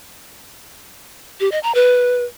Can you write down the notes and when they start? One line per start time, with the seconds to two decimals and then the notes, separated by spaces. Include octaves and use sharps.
1.40 G4
1.52 D#5
1.63 A#5
1.75 B4